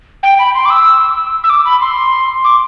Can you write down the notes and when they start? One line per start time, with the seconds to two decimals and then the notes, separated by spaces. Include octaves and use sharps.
0.23 G5
0.39 B5
0.55 C6
0.65 D6
0.70 E6
1.44 E6
1.49 D6
1.65 B5
1.81 C6
2.44 D6